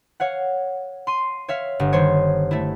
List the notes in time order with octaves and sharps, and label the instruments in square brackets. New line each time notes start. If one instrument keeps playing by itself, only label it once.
[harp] C#5 F5 F#5
C6 D#7
C#5 E5 F5
G1
D#3 G3 C5 C#5
A3 E4